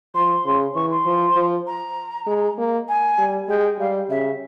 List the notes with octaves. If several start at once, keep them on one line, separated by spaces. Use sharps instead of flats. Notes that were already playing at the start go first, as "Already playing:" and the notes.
F3 C6
C#3
E3 C#6
C6
F3
F3
A#5
G#3
A#3
G#5
G3
G#3 G5
G3 F5
C#3 E5